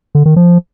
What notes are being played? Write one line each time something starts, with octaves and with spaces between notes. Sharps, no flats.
D3
D#3
F3